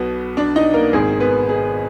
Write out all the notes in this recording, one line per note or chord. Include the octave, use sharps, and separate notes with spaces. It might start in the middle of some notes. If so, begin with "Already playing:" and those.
Already playing: B1 B2 B3
D4 D5
D#4 D#5
A#3 A#4
G#1 G#2 D#3 G#4
B3 B4
G#4